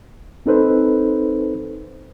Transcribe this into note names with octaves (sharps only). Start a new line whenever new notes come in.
C4 D#4 A4 B4 C5